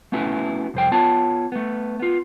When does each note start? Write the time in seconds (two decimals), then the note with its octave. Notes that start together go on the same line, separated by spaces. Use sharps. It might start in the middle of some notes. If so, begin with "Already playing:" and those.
0.12 A3 B3 C#4 E4 F#4
0.74 C2 F2 C5 G5
0.91 B3 F4 C#5 A5
1.52 A3 B3
2.00 B3 F4